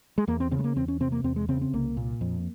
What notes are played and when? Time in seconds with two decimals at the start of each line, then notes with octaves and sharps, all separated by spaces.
0.18 G#3
0.28 E2 A#3
0.40 C4
0.51 C#3 C4
0.59 G#3
0.64 A#3
0.76 E2 C4
0.88 C#4
1.00 C3 C4
1.12 A#3
1.24 E2 C4
1.36 G#3
1.49 C#3 C4
1.62 C4
1.74 C2 A#3
1.97 A#2
2.21 F2